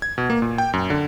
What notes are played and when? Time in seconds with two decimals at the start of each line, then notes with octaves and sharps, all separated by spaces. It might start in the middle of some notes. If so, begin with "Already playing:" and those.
0.02 G#6
0.18 B2
0.30 A#3
0.42 A#2
0.58 G5
0.73 F#2
0.90 D3